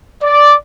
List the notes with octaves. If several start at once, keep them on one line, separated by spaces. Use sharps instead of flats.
D5